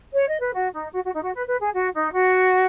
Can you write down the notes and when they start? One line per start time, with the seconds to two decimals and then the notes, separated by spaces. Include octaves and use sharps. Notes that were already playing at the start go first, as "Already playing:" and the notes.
0.14 C#5
0.28 D#5
0.41 B4
0.54 F#4
0.74 D#4
0.93 F#4
1.04 F#4
1.14 D#4
1.24 F#4
1.34 B4
1.47 B4
1.60 G#4
1.74 F#4
1.93 D#4
2.13 F#4